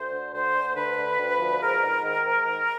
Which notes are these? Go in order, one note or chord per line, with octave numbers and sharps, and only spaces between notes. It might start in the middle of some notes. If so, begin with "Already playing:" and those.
Already playing: D2 C5
D3
D2 C5
D2
D3 B4
D2
D2
F3
G#2 A#4
G#2
D#3
G#2
D#3